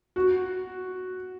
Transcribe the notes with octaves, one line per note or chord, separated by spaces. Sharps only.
F#4